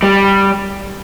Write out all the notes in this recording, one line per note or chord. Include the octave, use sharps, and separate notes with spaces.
G3